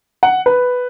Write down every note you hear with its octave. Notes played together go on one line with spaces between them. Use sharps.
F#5
B4